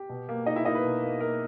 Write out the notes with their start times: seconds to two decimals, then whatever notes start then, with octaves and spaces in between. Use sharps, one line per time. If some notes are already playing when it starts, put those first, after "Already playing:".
Already playing: G4 G5
0.09 B2
0.29 A#3
0.46 A#3 D#4 D#5
0.56 E4 E5
0.65 A#3 D#4 D#5
0.75 B4
0.84 B2
1.03 A#3
1.21 A#3 A#4